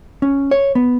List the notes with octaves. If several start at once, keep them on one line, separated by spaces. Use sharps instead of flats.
C#4
C#5
B3